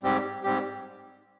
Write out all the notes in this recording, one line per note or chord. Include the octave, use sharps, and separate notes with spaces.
G#2 G3 C4 G4
G#2 G3 C4 G4